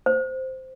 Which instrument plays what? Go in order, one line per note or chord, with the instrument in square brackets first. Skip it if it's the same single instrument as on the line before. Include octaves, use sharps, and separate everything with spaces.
[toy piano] C5